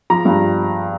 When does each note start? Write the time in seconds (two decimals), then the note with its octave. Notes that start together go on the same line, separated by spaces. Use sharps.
0.10 F3 A#5
0.25 G2